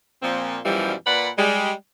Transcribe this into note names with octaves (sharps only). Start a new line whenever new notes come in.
A#2 F3 C4
F#2 B2 E3 F3 G3
A#2 B4 D5 F#5 B5
G3 G#3